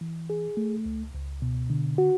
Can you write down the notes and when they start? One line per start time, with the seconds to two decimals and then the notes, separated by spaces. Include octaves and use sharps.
0.01 E3
0.30 G#4
0.57 A3
0.86 C#2
1.14 C#2
1.42 B2
1.70 D3
1.98 F#4